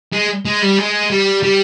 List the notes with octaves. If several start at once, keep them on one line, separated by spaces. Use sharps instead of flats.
G#3
G#3
G3
G#3
G3
G3